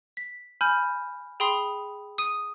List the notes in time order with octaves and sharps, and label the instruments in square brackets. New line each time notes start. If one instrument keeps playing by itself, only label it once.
[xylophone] B6
G#5 B5 F6 G6
G#4 G5 B5 C6 D#6 C7
D#6 D#7